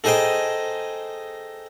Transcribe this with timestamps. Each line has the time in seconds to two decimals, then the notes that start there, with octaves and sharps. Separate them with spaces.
0.04 A3 D#4 G#4 C5 D#5 G5